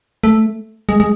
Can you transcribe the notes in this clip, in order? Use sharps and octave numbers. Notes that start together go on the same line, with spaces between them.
A3
G#3
G#3